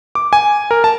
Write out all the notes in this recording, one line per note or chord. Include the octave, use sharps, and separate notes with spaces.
D6
G#5
A#4
A5